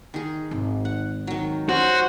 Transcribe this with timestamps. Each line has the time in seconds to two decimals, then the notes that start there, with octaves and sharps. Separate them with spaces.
0.14 D#3 G#4
0.51 G#1
0.85 F#5
1.27 D#3 F#3
1.69 C#4 F#4 C5